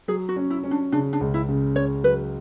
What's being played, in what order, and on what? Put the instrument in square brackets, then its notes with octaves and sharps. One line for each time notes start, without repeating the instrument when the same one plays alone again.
[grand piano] F#3 [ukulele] G#4
[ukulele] F#4
[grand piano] C#4
[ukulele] E4
[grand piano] C#4
[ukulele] D4
[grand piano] C#3 [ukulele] D4
[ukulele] D4
[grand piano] C#2
[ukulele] E4
[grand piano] C#3
[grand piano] C#4 [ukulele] C#5
[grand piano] F#3 [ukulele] B4